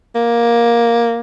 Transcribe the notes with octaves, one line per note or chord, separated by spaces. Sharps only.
A#3